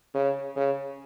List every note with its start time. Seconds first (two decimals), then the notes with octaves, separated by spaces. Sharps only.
0.15 C#3
0.56 C#3